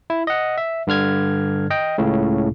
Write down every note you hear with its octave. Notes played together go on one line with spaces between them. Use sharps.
E4
D#5 F#5
E5
G2 D3 F6 G#6
D#5 G5
C#2 A2 C#3